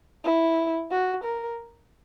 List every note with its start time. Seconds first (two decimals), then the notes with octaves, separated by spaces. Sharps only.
0.24 E4
0.91 F#4
1.24 A#4